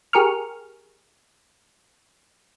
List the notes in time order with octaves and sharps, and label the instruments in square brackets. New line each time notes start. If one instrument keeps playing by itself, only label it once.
[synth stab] G4 G#4 A#4 C#6 F6